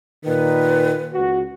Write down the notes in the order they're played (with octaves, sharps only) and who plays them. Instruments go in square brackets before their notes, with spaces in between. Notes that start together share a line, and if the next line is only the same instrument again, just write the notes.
[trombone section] A#2 D#3 [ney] B4
[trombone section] C#2 F#4